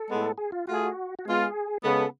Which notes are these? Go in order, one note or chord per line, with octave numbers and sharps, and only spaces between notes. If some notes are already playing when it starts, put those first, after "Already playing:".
Already playing: A4
A2 G#3 B3
G#4
F4
A3 F4 F#4 G#4
F#4
G#3 B3 F4 G#4
C#3 G#3 B3 A4